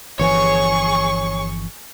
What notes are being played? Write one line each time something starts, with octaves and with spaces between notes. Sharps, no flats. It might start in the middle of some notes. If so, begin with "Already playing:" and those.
G1 E3 F3 G#4 C#5 C#6